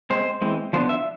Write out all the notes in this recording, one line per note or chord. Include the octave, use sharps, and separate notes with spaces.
G#3 C4 C5
E3 G#3 C4
F3 B3 D4 C5
E5